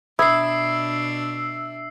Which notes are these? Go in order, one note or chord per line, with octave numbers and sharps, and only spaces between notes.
B2 D4 E5 B5 D#6 E6 G#6 C7